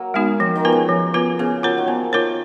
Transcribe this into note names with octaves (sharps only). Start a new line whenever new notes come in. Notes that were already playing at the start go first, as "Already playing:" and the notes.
Already playing: F#3 A#3
G#3 B3 D#4 F#4
D#3 F3
D#3
B3 F4 B4
C#3
F3
B3 F4 B4
C#3 B3
F#3 F4 A#4 C#5
D#3
F3 B3
D#3 F4 A#4 C#5